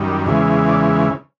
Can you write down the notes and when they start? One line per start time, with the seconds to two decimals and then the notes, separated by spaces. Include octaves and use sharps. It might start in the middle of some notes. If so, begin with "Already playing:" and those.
Already playing: F#2 D#3 G3
0.26 E2 C#3 E3 G#3
0.69 D5